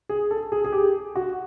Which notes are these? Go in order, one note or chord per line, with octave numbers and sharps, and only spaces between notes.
G#4
A4
G#4
G#4
G4
F#4